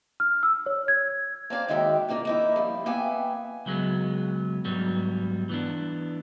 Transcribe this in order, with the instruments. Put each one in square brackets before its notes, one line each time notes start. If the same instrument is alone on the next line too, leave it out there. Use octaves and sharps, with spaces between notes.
[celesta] F6
E6
C#5
G#6
[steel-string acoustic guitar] A#3 C5 D5 F5
D#2 G#2 D#3 F#4 E5 G5
B2 D#3 A#3 D4 F4
A#3 D#4 E4
F3 G3
A#3 B3 E5 G5 G#5
[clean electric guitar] C#2 F#3 G#3 B3
G#2 F#3 G3 B3
E3 B3 D4